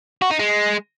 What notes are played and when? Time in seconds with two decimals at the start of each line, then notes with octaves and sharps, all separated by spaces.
0.22 F#4
0.30 D#4
0.39 G#3